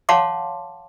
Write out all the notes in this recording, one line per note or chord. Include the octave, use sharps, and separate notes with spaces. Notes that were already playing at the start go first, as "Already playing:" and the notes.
C#5 F5 F#5 A5 C6 D6